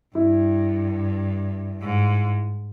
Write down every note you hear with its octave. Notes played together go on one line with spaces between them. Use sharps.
G2 E4
G#2